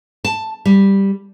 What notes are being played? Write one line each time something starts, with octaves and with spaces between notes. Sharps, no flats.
A5
G3